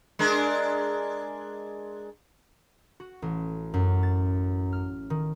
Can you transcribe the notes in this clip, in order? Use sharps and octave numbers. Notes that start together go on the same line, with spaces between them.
G#3 D4 A#4
F#4
A1
F#2
A6
F6
D#3